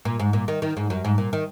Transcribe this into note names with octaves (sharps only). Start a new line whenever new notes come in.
A#2
G#2
A#2
D#3
D#3
G#2
F#2
G#2
A#2
D#3